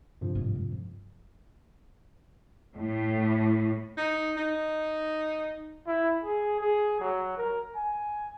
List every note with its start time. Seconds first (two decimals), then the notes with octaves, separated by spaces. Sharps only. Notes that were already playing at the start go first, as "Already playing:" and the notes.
0.21 G2 C3 F3
0.35 C2 G#2
0.55 F2
2.75 A2
3.97 D#4
4.37 D#4
5.87 E4
6.24 G#4
6.61 G#4
7.00 F#3
7.37 A#4
7.75 G#5